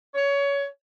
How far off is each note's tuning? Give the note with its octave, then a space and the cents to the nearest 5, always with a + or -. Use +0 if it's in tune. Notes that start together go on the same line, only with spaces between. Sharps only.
C#5 +20